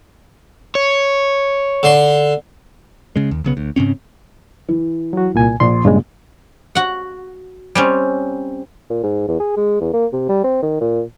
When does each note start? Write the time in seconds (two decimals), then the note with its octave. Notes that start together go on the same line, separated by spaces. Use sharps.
0.75 C#5
1.83 D3 C6
3.16 C#3 G#3
3.31 D#2
3.44 B1 C#3 B3
3.57 D2
3.76 G#2 C#3 C4 C#4
4.68 E3
5.13 F#3 F#4
5.34 C2 A#2 G#5
5.60 A#1 C6
5.85 G2 A#2 C#3 G#3
6.75 F#4 F#5
7.75 G3 C4 C#4
8.90 A#2
9.04 G#2
9.28 E2
9.40 G#4
9.56 G#3
9.80 E2
9.93 A#3
10.13 C3
10.29 G3
10.44 C4
10.62 D#3
10.81 A#2